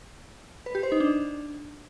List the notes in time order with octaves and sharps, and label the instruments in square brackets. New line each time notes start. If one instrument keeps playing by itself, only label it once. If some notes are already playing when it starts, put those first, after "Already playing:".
[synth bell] B4
G4
C5
D#4
D4